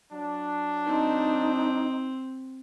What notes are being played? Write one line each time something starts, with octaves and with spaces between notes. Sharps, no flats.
F#3 D4
C4 D#4